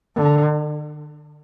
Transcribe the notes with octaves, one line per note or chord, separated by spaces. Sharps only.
D3